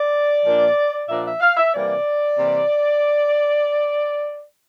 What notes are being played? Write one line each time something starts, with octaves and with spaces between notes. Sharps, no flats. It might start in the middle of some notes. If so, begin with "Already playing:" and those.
Already playing: D5
A#2 F3 A#3 D4
A#2 F3 A#3 D4 E5
E5
F5
E5
C3 E3 G3 A#3 D5
C3 E3 G3 A#3